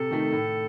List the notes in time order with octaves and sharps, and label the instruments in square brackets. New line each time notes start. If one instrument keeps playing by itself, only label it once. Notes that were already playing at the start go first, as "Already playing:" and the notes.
Already playing: [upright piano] C3 [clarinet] A4
[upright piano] D#3 A3 D#4
A2